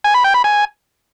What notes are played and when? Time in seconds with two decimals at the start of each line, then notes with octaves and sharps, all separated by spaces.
0.04 G#5
0.14 B5
0.24 G5
0.34 B5
0.44 G#5